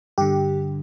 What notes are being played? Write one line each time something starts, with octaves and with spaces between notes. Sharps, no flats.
G2 D3 G4